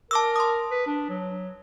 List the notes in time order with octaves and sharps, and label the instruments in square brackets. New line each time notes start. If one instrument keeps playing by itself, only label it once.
[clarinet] A#4 [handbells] A5 D6 E6
[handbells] C6 D#6
[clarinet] B4
D4
F#3